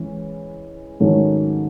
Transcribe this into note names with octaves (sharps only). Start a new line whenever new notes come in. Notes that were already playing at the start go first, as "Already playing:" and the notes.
Already playing: E3 G#3 C#4
G#2 D#3 F#3 A3 C#4